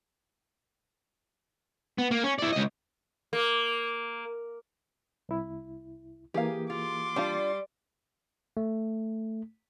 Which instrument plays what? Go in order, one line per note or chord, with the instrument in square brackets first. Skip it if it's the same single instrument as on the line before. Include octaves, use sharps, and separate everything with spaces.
[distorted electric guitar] B3
A#3
C#4
E4 D5
C#2 D#5
[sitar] A#3
[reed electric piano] C2 E4
[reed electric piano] E3 A#3 [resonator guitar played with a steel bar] G4 [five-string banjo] G#4 F5
[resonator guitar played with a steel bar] F4 [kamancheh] C6 D6
[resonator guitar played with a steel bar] G3 [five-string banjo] D4 F4
[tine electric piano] A3